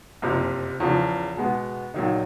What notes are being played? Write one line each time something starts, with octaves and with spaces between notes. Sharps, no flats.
F#1 F2 C3
E2 C#3 F3
B2 G#3 B3
A#1 A#2 F#3 A#3 D#4